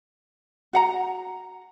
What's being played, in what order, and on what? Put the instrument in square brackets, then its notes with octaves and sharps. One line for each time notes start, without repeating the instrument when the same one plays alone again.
[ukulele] F#4 F#5 A#5